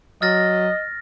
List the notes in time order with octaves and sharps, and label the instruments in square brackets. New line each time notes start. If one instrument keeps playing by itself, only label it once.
[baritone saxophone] F#3 [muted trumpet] D#5 [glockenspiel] F6 A6 A#6